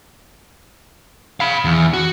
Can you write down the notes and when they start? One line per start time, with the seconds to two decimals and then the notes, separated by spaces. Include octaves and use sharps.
1.40 F5 B5
1.65 E2
1.94 F#4